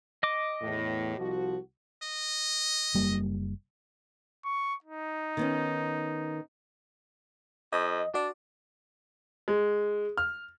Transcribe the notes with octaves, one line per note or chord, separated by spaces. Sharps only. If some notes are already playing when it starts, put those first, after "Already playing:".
D#5 D6
E2 A2
C2 F3 F#4
D#5
F#1 G3 A#3
C#6
D#4
D#3 B3 C#4
F2 D#5
D4 F#4 D5
G#3
F6